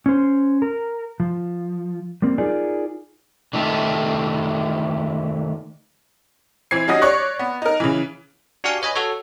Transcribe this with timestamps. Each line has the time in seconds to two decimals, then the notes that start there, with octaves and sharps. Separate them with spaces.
0.06 C#4 C5
0.62 A#4
1.20 F3
2.22 G3 A#3 C4
2.38 D#4 F4 G#4 A#4 D5
3.53 D3 D#3 A3 F4 G4
6.71 E3 C4 G#6 C7
6.88 G3 C#4 D#4 F#4 D#6 A#6
7.02 C#5 D5 C#6 F#6
7.39 B3
7.62 D#4 A#4
7.80 C#3 E3
8.64 D4 F#4 G4 F5 G#5
8.82 B4 C#5 D#5 G#5 B5
8.96 F#4 A4 C#5